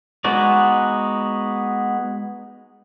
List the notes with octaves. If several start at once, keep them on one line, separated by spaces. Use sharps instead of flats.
G#3 B3 D#4 F#4 D5